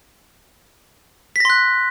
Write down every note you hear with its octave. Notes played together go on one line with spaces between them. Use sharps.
C6 F#6 A#6 B6